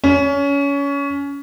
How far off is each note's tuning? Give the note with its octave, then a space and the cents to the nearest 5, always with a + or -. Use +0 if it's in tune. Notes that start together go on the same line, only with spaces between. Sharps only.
C#4 +25